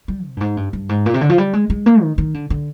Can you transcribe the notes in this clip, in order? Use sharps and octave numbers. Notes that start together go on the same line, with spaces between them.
G3
C3
G2
G#2
G2
G2
G#2
A#2
C3
D3
F3
G3
G#3
G#3
A#3
D#3
D#3
D3
D3